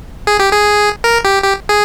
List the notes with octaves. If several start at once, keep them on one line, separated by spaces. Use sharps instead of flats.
G#4
G4
G#4
A#4
G4
G4
G#4